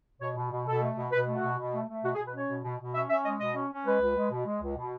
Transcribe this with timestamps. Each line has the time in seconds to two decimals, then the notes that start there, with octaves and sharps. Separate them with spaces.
0.21 B2 C#5
0.36 B2
0.51 B2
0.66 B2 A4
0.82 A3
0.97 B2
1.12 B2 B4
1.27 A3
1.35 F#4
1.43 B2
1.58 B2
1.73 A3
1.88 A3
2.03 B2 F#4
2.15 G#4
2.18 B2
2.26 B4
2.34 C#4 C#5
2.49 B2
2.64 B2
2.79 B2
2.94 C#4 E5
3.10 C#4 E5
3.25 G#3 D#5
3.40 B2 D#5
3.55 C#4
3.71 C#4
3.85 G#3 B4
4.01 C#2
4.16 G#3
4.31 B2
4.46 G#3
4.62 C#2
4.77 B2